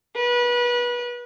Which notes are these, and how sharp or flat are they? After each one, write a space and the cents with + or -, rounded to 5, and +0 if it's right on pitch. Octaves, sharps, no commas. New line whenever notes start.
B4 -30